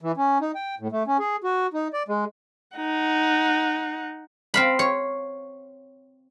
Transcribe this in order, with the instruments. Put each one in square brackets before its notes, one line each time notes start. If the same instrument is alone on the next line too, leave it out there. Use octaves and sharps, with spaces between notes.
[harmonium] E3
C#4
D#4
G5
A2
A3
C#4
G#4
F#4
D#4
D5
G#3
[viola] D#4 F#5
[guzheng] C4 F5 B5
C#5